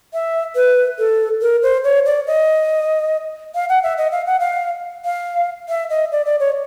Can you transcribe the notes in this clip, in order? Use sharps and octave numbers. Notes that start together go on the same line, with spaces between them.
E5
B4
A4
A#4
C5
C#5
D5
D#5
F5
F#5
E5
D#5
F5
F#5
F5
F5
E5
D#5
D5
D5
C#5